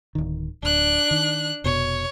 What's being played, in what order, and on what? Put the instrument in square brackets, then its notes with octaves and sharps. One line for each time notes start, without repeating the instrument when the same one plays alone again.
[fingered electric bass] D1 D#3
[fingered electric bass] D1 [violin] D4 F#6
[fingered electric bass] D#3
[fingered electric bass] F1 B2 [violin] C#5